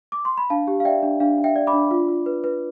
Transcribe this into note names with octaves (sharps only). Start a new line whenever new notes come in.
D6
C6
B5
D4 F5 A5
G4
F5
D5 E5 G5
D4
D4 F5
D4
E5 G5
D5
B5 D6
D4
F4
F4
B4
B4